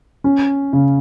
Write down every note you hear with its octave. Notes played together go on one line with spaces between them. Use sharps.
C#4
C#3